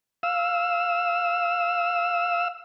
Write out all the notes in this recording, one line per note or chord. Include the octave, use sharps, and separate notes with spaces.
F5 E6